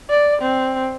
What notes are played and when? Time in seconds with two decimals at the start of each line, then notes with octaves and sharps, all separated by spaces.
0.10 D5
0.42 C4